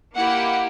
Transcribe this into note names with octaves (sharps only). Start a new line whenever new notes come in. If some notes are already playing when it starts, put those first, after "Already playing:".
A#3 E4 G4 F#5